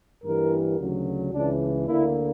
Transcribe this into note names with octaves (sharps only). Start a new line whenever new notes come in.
G2 E3 G3 A#3 A#4
D2 C#3 F#3
C#2 C#3 E3 D4
D2 D3 A#3 E4